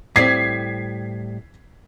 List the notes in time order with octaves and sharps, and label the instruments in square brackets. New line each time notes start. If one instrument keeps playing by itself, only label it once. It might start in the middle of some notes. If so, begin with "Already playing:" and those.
[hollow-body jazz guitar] A2 G3 C4 [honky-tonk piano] G#6 B6 C7